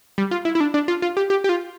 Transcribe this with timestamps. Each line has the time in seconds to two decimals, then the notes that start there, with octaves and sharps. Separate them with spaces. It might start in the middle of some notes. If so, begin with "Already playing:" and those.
0.18 G3
0.31 F4
0.45 E4
0.55 E4
0.60 D4
0.74 D4
0.88 F4
1.02 F4
1.17 G4
1.30 G4
1.44 G4
1.49 F4